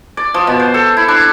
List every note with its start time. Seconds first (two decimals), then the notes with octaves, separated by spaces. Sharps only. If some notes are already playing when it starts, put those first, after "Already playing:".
0.17 D5
0.34 F3
0.47 B2
0.59 C5
0.74 A4
0.97 E4
1.08 D4